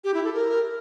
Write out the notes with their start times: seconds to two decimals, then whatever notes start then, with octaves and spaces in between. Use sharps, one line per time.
0.04 G4
0.14 E4
0.24 A4
0.34 A#4